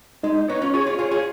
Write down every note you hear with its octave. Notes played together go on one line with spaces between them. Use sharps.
G#3 D#4
B3 D#4 C#5
C#4 F4
F4 G#4 C#5
F4 G#4
F4 G#4 C#5
F4 G#4